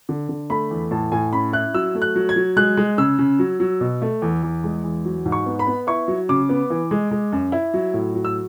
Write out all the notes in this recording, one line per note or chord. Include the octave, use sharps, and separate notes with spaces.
D3
D3
A3 B5
E2
A2 A5
A2 G#5
C#4 B5
E4 F#6
F#3 E6
A3
F#6
F#3
G#6
F#3
G#3 F#6
G#3
C#3 E6
C#3
F#3
F#3
B2
A3
E2
E2
G#3
E2
F#3
G#2
C#6
B3
B5
B3
E4 C#6
F#3
C#3 D6
B3
E3
G#3
G#3
F#2
E4
F#3
A2
F#3
E6